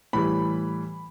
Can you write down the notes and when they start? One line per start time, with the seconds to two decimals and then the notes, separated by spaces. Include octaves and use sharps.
0.13 A2 E3 G3 B5